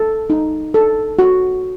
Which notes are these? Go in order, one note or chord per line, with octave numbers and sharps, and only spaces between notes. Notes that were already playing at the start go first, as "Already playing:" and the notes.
Already playing: A4
D#4
A4
F#4